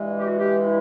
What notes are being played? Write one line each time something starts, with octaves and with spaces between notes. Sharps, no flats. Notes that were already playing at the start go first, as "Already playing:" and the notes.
Already playing: G2 E3 G#3
G4
F#4
G4
E4